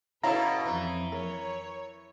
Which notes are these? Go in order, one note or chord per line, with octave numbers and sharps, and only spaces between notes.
B2 C#4 E4 A4 B4 C#5 F5 A#5
F2 E3
A#4 C#5